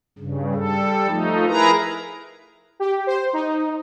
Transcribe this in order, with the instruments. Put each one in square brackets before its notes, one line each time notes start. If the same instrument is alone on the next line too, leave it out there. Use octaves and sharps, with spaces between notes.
[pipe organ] G2 C#3
G3 A4
F3 A3 D#4
E4 G#4 A#4 B4 A#5
[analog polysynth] G4
C5
D#4